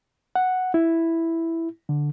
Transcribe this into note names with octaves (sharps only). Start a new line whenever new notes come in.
F#5
E4
D3